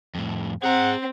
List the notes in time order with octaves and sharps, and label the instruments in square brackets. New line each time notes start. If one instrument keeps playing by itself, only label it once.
[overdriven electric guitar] F2 A2
[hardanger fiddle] C4 [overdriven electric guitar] G#4 A#5 [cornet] F#5